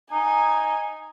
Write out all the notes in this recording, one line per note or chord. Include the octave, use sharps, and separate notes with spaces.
D#4 G#5